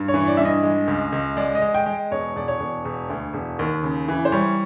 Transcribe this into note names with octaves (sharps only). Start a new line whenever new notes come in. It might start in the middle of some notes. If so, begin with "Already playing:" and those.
Already playing: G2
C#5
E3
D5
G2 E5
D#5
G#3
C#2
C#2
G#3 D5
D#5
G#3
G5
G#3
E1 C#5
E1 D5
C#5
E1
E1
D2
E1
D#2
C#3
E3
C5
G3 C#5